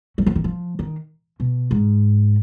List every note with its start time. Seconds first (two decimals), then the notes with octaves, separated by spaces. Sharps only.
0.18 F#3
0.26 F3
0.36 D#3
0.44 F3
0.79 D#3
1.40 B2
1.71 G#2